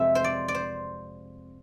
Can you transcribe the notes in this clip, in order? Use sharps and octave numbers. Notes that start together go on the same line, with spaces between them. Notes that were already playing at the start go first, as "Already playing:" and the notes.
Already playing: F2 C3 G#3 E5
C5
D5
D5
C5